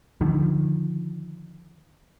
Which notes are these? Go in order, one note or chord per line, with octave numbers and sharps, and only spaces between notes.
D3 D#3 F3